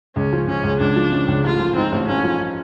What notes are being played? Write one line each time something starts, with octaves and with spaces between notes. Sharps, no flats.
C#2 C#4
F3
C#3 C#4
C#2
C#2 D4
F3
C#3
C#2
A1 F4
F3
G#2 C4
A1
A1 C#4
F3